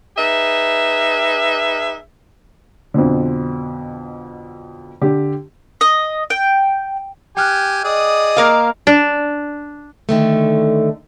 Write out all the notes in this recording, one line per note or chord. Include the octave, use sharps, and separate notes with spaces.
D#4 G#4 B4 E5
F2 B2 D3
D3 G4
D#5
G5
G4 G5 G#5 F6 F#6
G#4 D5 D#5 D#6
A#3 A#4 F5
D4
D3 D#3 A3